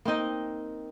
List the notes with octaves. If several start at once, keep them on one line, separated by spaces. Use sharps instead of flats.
A#3 C4 D#4 D#5